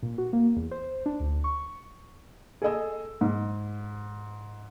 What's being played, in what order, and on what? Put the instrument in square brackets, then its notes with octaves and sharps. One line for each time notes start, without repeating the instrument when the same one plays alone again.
[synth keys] A#2
F#4
A#3
E2
C5
D4
D2
C#6
[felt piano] G#4 A4 D#5 E6
G#2